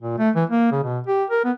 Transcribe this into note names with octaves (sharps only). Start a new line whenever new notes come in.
A#2
A3
E3
A#3
C#3
B2
G4
A#4
B3